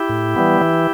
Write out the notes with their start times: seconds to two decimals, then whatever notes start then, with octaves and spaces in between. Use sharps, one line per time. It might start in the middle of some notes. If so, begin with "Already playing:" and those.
Already playing: E4 G4
0.09 A2
0.36 E3 G3 B3
0.61 E3